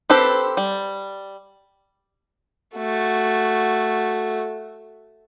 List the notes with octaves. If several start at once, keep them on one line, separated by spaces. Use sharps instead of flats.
C4 G4 A4 B4 C5
G3
A3 F#4